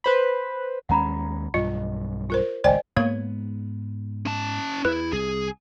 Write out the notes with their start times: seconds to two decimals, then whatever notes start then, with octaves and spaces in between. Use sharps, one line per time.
0.04 B4 C5 B5
0.89 D#2 G#3 C#4 F#5 A#5 B5
1.54 B1 G2 F4 D#5
2.30 F4 A#4 C5
2.64 G#1 C#2 C5 D5 D#5 G5 G#5
2.96 G#2 A#3 B3 C#5 G#6
4.26 C#4 A5
4.85 E2 E4 B4
5.13 C2 G#4